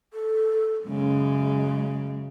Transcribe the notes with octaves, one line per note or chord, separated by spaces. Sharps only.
A4
F#2 C#3 G#3